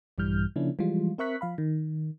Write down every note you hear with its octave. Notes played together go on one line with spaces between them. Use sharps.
A#1 G2 E3 G3 F6 G6
C#3 F3 A#3 C#4 D4 E4
E3 F3 G3 G#3 F4
C4 A#4 E5 C#6 F#6 B6
F3 F5 B5
D#3